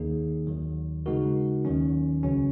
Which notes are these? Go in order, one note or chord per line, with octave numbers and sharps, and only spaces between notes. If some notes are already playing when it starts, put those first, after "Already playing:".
Already playing: D#2 D#3 A#3 D#4 G#4
D#2 D#3 F#3
C#3 G#3 D#4 F#4 A#4
D#2 D#3 F#3 C#4
C#2 C#3 F#3 C#4